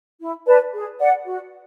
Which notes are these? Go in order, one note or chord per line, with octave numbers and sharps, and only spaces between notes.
E4
B4 D5 A5
G#4
D5 F#5
F#4